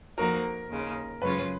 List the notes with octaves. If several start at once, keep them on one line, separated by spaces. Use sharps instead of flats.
F2 F3 A#3 D#4 F#4 A#4
D#2 C#3 G#3
F#2 C#3 G#3 C#4 F4 B4